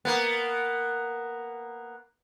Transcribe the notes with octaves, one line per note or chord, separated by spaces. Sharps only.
A#3 B3